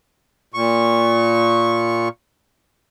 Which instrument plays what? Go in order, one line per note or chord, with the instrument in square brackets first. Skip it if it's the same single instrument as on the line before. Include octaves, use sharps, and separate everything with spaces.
[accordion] A#2 C#6